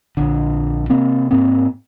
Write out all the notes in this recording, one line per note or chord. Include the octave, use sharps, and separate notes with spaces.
A#1 D3
C3 A#3 C4
G#2 A#3 C4